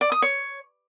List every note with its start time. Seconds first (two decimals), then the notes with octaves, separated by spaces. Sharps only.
0.01 D5
0.12 D#6
0.22 C#5